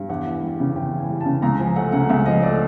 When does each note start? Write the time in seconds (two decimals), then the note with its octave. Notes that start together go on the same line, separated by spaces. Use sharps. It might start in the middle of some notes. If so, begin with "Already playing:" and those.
Already playing: G2
0.09 E2 F#5
0.26 E3
0.43 G3
0.60 C#3
0.76 E2 G5
0.93 E3
0.99 G#5
1.09 G3
1.21 A5
1.26 C#3
1.42 C#2 A#5
1.59 F3 G#5
1.76 A3 F#5
1.92 C#3 F#5
2.09 C#2 E5
2.26 F3 D#5
2.42 A3 D5